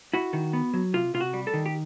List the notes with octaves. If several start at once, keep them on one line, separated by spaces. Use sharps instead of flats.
E4 F#4
D#3
B3
F#3
C3 F4
C3 F4
F#4
G3
A4
D#3
G4